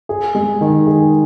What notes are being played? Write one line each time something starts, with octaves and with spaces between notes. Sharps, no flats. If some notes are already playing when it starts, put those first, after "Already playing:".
G#4
G#3
D#3
G#4